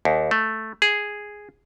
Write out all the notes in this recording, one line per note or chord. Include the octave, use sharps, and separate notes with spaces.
D#2
A3
G#4